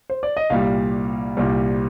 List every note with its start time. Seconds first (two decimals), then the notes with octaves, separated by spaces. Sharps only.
0.10 C5
0.23 D5
0.37 D#5
0.50 C2 A#2 G3 F5
1.37 C2 A#2 G3